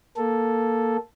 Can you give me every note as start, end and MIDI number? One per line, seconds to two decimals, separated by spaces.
0.17 0.97 58
0.17 0.97 69